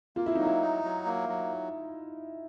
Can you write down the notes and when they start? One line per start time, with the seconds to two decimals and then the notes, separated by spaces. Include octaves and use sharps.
0.16 A#3 F4
0.26 E4
0.35 F#3 D#4
0.45 E4
0.61 D#4
0.84 F#3
1.06 A#3
1.29 F#3